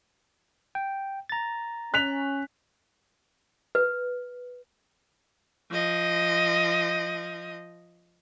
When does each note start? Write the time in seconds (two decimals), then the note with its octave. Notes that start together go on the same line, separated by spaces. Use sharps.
0.75 G5
1.29 A#5 A6
1.94 C#4 F#6 B6 F7
3.75 B4
5.71 F3 D#5